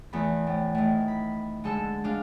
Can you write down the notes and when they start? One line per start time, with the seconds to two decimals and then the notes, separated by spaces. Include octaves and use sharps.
0.13 E2 A3 B3 B5
0.47 A2
0.75 A2 D#3
1.08 B5
1.64 D3 G#3 A4 A5 E6
2.04 G#3 D4 F5 F6